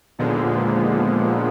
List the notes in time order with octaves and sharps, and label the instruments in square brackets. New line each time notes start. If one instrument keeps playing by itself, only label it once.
[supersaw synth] D#2 A#2 D3 F3 G#3 B3